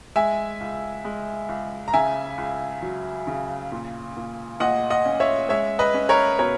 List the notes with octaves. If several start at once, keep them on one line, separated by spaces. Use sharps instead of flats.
G#3 E5 G#5
C#2
G#3
C#2
A#5
C#3 E5 G#5
C#2
F#3
C#3
A#2
A#2
A#2 D#5 F#5
D#5 F#5
C#4
C#5 E5
G#3 C#5 E5
B4 D#5
C#4
A#4 C#5
B2 A#4 C#5